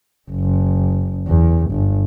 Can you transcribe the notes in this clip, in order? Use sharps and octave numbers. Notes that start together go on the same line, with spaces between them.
F#1
E2
G1